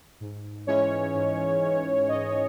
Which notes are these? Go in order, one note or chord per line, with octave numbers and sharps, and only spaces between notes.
G#2
E3 G#3 C#4 C#5
G#2
E3 G#3 C#4
G#2 D#5